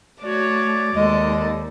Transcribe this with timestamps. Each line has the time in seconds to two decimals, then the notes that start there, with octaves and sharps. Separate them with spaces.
0.23 A3 F#4 C#5 D5
0.94 D#2 G#3 A4 D#5